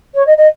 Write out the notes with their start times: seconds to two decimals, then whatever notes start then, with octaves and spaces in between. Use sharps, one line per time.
0.15 C#5
0.27 D#5
0.38 D#5